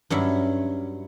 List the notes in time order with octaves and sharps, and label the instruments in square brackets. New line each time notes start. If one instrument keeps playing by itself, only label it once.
[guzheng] G2 F#3 C#4 E4